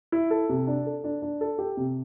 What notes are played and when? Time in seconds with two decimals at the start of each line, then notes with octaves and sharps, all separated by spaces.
0.12 E4
0.30 A4
0.49 C3
0.67 D4
0.86 A4
1.04 D4
1.22 D4
1.41 A4
1.59 G4
1.77 C3